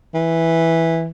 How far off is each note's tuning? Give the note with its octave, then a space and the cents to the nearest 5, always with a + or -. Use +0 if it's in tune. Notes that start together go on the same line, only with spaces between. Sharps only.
E3 -5